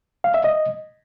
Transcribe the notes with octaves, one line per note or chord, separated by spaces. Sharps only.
F5
E5
D#5